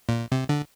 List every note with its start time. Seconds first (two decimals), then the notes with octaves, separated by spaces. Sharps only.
0.09 A#2
0.32 C3
0.49 D3